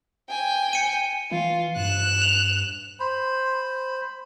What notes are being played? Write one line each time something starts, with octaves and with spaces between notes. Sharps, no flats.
G5 G#5
C#7 D#7
E3 F4
G2 F#6 E7
F7
C5 B5